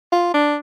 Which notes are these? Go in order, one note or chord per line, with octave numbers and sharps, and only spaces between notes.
F4
D4